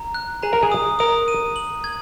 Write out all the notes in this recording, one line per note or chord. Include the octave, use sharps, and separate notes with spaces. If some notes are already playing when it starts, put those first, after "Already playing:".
Already playing: A#5
F#6
G#4 A#5
A#4
G#4
D#6
A#4 D#6
D#7
F#7
G#6